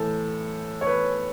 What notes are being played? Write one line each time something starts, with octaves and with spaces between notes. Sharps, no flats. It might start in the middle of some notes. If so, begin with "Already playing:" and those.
Already playing: A2 E3 A4
C#5
B4